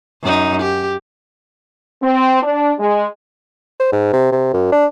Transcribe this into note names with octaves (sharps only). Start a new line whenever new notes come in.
F#2 D#4
G4
C4
D4
G#3
C5
G#2
C3
C3
F#2
D4